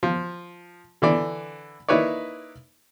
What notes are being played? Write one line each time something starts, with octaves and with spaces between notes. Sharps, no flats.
F3
D3 E3 D5
A#3 D#4 E4 B4 C#5 D5